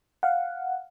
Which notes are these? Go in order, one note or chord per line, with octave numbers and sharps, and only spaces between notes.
F5 F#5